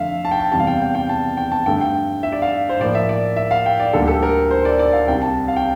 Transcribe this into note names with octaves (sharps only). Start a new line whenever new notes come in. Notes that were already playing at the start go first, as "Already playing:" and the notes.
Already playing: F2 D3 A3 E5 F5
A5
G5
A5
E2 C3 G3 A5
F5
G5
G5
G5
A5
G5
A5
G2 D3 A3 G5
G5
E5
D5
F5
C5
A2 F3 A#3 D5
E5
D5
E5
F5
G5
D5
D2 D3 G3 A#3 A4
G4
A4
A#4
C5
D5
D5
F5
C2 C3 G3 G5
A5
F5
G5